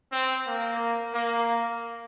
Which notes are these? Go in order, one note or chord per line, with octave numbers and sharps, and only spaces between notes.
C4
A#3
A#3